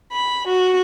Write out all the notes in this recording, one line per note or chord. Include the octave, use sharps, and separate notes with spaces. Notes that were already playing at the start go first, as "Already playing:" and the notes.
B5
F#4